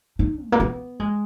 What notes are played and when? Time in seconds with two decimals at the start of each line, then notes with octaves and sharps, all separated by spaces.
0.19 D#4
0.45 G#3
0.52 A#3
0.60 B3
1.00 G#3